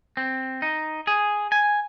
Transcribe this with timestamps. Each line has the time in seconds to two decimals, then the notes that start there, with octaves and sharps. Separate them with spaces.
0.17 C4
0.62 D#4
1.07 G#4
1.52 G#5